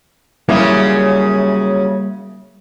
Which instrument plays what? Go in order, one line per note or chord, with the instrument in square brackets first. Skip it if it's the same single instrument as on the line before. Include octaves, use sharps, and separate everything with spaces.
[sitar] F#2 C#3 C#4 [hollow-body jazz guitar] G3 A#3 E4